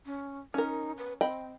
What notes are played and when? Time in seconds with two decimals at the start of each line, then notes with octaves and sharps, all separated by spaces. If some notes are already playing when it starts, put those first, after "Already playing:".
0.06 C#4
0.54 C#4 D#4 A#4
0.97 B4
1.21 C4 D#5 G5 B5